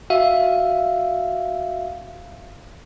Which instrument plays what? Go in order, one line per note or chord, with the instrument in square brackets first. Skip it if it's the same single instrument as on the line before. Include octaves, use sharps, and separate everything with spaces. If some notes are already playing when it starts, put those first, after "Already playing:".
[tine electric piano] F#4 E5 F5